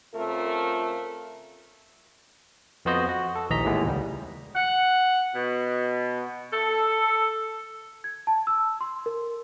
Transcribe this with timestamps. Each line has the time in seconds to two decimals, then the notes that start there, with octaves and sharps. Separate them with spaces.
0.15 C#3 A3 C4 F4 A#4
2.85 F2 B3 F4 F#4 C5 D#5
3.09 F#4
3.36 A4
3.50 A#1 D#2 E3 D#5 A#5 B6
3.64 D#2 A2 E3 G#3 B3
3.86 C#2 G3
4.55 F#5
5.35 B2
6.53 A4
8.04 G#6
8.27 A5
8.47 E6
8.81 C6
9.06 A#4